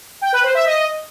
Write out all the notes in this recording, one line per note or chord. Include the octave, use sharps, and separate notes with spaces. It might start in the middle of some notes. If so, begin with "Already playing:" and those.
G5
B4
C5
E5
D#5